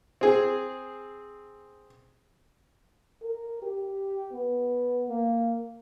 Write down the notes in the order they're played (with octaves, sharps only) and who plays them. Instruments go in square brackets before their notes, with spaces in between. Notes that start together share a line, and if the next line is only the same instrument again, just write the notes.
[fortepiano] C4 G#4
[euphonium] A#4
G4
B3
A#3